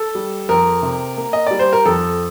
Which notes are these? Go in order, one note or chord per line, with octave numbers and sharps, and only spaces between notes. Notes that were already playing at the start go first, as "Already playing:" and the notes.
Already playing: A4
G3
F2 A#4
C3
A#3
D#5
G3 D5
C5
A#4
F2 A4